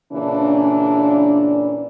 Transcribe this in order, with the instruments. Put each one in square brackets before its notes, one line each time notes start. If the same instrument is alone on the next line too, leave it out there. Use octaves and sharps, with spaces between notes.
[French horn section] A#2 C#3 E3 D4